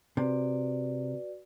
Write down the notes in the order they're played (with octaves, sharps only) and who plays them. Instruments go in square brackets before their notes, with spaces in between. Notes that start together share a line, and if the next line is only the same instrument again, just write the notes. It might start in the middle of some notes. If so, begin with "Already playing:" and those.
[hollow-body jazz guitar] C3 [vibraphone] F#4 B4 D5